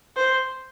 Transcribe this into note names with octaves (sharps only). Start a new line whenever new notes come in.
C5